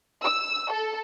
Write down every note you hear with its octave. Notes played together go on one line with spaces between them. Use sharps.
E6
A4